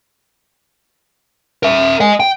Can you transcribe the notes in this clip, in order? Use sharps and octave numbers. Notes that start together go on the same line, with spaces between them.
A#4 E5
D#5 G#5
G5